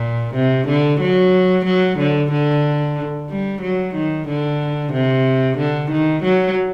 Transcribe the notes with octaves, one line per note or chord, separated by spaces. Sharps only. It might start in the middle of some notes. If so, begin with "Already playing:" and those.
Already playing: A#2
C3
D3
F#3
F#3
D3
D3
G3
F#3
D#3
D3
C3
D3
D#3
F#3